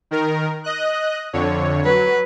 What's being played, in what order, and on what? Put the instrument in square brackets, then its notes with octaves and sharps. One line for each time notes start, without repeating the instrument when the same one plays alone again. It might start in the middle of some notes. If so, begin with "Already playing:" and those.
[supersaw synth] D#3 A#4
D#5 F#6
F2 D3 C#5
[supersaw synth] F#3 [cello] B4